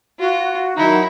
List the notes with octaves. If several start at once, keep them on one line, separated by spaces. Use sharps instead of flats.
F4 F#4
D#3 F#3 D#4 E4